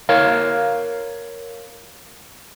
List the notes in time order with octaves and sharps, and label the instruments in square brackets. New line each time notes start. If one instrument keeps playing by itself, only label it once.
[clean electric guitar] A#4 C#5 F5